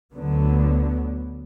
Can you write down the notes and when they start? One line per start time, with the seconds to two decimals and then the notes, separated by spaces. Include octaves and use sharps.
0.13 D2 D3 F#3 B3